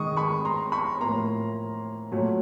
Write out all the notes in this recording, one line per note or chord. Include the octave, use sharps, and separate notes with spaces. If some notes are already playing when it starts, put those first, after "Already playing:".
Already playing: D#3 G#3 C#6 D#6
B5 C#6
A#5 C6
B5 C#6
A2 F3 A#3 A#5 C6
A#2 F#3 A3